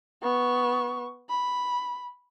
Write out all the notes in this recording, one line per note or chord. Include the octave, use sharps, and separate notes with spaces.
B3 C#6
B5